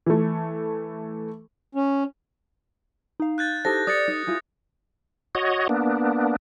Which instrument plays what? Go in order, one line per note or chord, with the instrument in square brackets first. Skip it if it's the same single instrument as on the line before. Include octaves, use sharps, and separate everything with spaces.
[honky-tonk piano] E3 A3
[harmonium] C#4
[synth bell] D#4 F5
[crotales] F#6 G6 A6
[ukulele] D#4 E4 A5 [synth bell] G4 A4 C5 [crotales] A#6
[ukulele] D5 [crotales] D#6 A6 C#7
[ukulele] D#4
E4 F4 G#4
[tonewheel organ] F#4 C#5 D#5
A#3 B3 D4